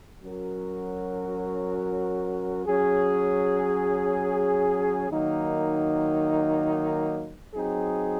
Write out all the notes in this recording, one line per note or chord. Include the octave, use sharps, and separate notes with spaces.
F#3 C#4 F#4 A#4
F#3 C#4 G#4
D#3 F#3 A#3 D#4
F#3 C4 D#4 G#4